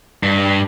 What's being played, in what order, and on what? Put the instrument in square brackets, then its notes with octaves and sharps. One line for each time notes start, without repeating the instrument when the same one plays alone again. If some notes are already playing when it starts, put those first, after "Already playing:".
[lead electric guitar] G2